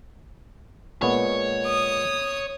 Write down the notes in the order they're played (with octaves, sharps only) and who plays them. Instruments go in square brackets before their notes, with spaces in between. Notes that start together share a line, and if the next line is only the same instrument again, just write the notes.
[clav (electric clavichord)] A#2 G#3 B3 [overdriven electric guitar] C#5
[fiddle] D#6